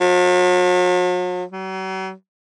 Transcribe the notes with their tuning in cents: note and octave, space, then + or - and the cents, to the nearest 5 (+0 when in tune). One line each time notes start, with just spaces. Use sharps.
F#3 -45
F#3 +40